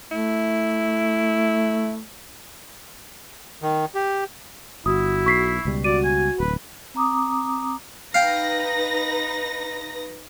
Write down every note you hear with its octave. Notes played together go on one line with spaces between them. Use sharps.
A3 E4
D#3
G4
G1 E4 F#4 D#6
B1 C#6 B6 C7
C#2 B2 G3
F#4 D5 D#7
G#5
D1 B4
C4 A#5 D6 D#6
D#4 B4 F5 G5 A#6